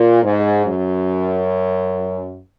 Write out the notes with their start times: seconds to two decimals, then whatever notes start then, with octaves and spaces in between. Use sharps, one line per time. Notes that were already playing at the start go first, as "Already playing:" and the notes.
Already playing: A#2
0.24 G#2
0.64 F#2